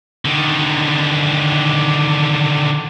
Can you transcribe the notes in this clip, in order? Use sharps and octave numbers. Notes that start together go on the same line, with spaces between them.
D3 D#3